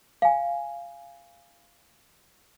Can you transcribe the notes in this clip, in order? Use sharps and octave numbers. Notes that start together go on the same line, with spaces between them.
F5 G#5